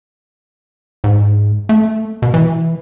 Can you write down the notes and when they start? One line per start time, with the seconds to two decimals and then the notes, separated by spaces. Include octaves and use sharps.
1.04 G#2
1.69 A3
2.22 B2
2.34 E3